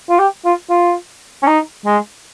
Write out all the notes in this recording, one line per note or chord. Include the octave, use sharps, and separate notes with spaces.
F4
G4
F4
F4
C#4
D#4
G#3